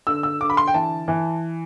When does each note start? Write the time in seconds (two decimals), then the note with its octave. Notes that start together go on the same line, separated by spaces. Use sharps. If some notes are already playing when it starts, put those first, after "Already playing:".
0.07 D3 E6
0.23 E6
0.40 D3 D6
0.50 B5
0.57 C6
0.67 G5
0.74 E3 A5
1.08 E3